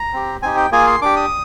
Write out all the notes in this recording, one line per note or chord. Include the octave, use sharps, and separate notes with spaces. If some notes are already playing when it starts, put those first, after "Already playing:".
Already playing: A#5
C4 G4
C4 D#4 G4 G#5
G5
A#3 F4 G#4 G#5
C6
D4 G4 D6
D#6